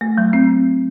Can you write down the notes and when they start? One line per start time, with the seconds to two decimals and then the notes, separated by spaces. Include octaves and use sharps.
0.01 A3
0.18 F#3
0.33 C4